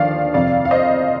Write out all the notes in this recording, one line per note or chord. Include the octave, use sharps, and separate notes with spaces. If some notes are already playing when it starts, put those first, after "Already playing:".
Already playing: D#2 D3 F3 D5 F5
F2 C3 F3 D5 F5
F5
C5 D#5